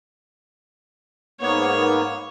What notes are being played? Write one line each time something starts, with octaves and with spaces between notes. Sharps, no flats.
G#2 A#3 B3 C#5